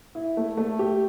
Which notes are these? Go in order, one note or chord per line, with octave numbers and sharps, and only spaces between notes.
E4
A3
A3
G4